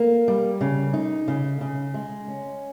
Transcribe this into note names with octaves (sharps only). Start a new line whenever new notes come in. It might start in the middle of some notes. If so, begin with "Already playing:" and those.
Already playing: A#3
G3
C#3
D#4
C#3
C#3
G#3
C#4